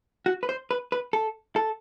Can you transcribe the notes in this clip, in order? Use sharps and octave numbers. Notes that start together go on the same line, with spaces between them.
F#4
B4
C5
B4
B4
A4
A4